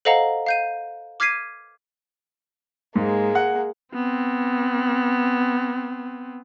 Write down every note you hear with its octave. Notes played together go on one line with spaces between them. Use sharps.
A4 C5 D#5 F5 F#5 A#5
F5 G6 D#7
D6 F6 G#6 B6 C7 D#7
G#2 G#3 A#3
F#5
B3 C4